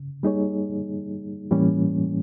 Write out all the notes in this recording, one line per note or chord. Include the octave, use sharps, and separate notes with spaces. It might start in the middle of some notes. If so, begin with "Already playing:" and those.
Already playing: C#3
G3 A#3 D#4 G#4 C#5
A2 E3 G3 A#3 C#4